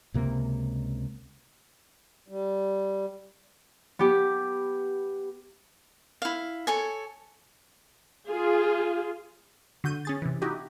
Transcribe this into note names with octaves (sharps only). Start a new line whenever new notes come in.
C#2 C3 A#3
G3
B3 G4
E4 F5
A4 C#5 G#5
F4 G#4
D3 F#4 G6 D#7
C#4 G#4 A6
C3 E3
D#4 E4 F#4 G4 D#5